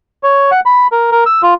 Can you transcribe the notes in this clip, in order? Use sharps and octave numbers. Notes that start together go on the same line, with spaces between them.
C#5
F#5
B5
A#4
A#4
E6
F4